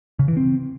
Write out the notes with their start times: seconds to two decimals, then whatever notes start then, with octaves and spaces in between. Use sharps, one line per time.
0.19 C#3
0.28 E3
0.37 C4